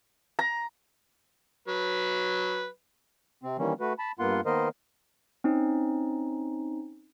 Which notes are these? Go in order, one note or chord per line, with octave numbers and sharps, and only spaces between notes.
A#5
F#3 B4
C3 C4
D#3 E3 G3 A#3 C#4
A3 F#4 B4
A5 B5
G2 A#3 B3 F4 F#5 C6
D#3 A#3 B3 A#4 C5 D#5
C4 C#4 D#4